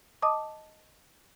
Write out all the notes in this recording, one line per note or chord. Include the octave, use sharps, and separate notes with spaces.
D#5 A5 D6 D#6